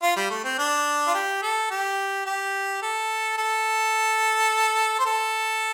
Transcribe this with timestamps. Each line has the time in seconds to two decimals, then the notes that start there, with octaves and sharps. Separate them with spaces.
0.02 F4
0.16 G3
0.30 A3
0.44 C4
0.58 D4
1.07 F4
1.14 G4
1.42 A4
1.70 G4
2.26 G4
2.82 A4
3.38 A4
4.99 C5
5.06 A4